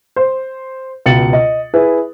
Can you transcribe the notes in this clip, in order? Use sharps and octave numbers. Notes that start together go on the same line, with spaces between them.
C5
C#2 B2 A6 C#7 F#7
D#5
E4 G#4 B4